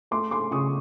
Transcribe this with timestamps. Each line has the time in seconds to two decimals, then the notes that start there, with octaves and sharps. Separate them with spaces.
0.11 A3 C6 D6
0.31 A3 C6 D6
0.51 C#3 C#6 D#6